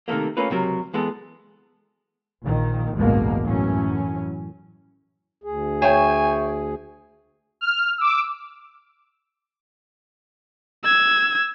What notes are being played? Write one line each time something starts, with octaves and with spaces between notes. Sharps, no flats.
C3 D#3 F3 A3 A#3
A3 A#3 C#4 F4 B4
C#2 C3 F#3 A#4
E3 G#3 B3 A4
A#1 A#2 D#3
A1 D2 G2 B2 G#3 A#3
F#2 A2 E3 F#3 C#4
D2 G#4
C#5 E5 G5 G#5 C#6
F6
D6 E6
E6 G#6